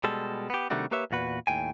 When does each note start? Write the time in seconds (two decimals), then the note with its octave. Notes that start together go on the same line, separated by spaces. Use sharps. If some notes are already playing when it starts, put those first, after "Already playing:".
0.04 B2 G3 G#3 A4
0.50 B3 G4
0.70 C3 D#3 G3 A3 D4 F#4
0.91 A#3 G4 B4 C#5 E5
1.11 E2 A#2 F#4 B4
1.47 D#2 A2 G5 G#5